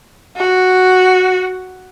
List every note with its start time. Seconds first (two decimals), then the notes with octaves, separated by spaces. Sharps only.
0.37 F#4